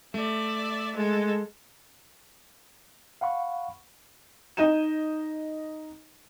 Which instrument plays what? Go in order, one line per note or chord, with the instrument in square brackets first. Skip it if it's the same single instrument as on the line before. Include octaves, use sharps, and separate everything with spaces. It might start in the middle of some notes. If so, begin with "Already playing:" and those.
[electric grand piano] A3 [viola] D5 E5
[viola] G#3 A4
[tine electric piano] F5 F#5 B5 C#6
[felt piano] D#4 D#5 G6 D#7 E7